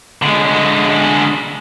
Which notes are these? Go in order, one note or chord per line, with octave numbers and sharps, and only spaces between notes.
D3 G#3